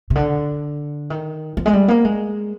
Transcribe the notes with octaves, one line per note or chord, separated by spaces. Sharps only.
C3
D3
D#3
F3
G#3
G3
A#3
G#3